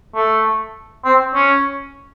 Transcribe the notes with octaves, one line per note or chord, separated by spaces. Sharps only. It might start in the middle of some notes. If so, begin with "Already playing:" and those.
A3
C4
C#4